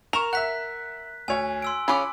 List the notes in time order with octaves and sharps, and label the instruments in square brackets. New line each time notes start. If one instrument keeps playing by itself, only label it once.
[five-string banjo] A#4 [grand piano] C#6 E7 F7
[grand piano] E5 F#5 [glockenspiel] F#6 B6
[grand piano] D2 C#5 [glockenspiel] G#5
[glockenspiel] C6 E6 D7
[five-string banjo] C#4 F4 G#4 [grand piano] B5 D6